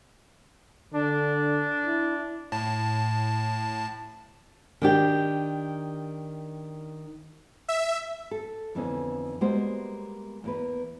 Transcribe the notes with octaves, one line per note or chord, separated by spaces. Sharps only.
D3 D4
E4
A2 A5
D#3 D4 G4
E5
A4
F2 D3 E3 B3 C#4
G3 G#3 A#3 B3 F#4 C5
E2 A#3 B4